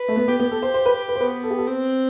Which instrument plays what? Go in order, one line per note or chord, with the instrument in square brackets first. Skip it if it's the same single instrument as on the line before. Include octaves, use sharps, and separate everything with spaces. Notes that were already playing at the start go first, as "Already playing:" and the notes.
Already playing: [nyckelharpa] B4
[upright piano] A3
B3
[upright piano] B3 [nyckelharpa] G4
[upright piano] B3
A4
C5
C5
B4
B4
C5
[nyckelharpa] B3 [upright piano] B4
[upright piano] A4
G4
A4
[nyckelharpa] C4